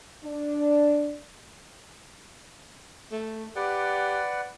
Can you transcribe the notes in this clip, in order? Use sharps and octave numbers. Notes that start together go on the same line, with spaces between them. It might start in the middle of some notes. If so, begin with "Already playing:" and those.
D4
A3
G4 B4 D5 F#5